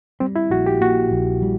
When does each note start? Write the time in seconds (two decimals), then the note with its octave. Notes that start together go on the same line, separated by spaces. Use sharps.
0.20 G3 C4
0.36 E4
0.50 A#1 F#4
0.66 G4
0.81 A#2 F#4
1.11 A#1
1.42 G3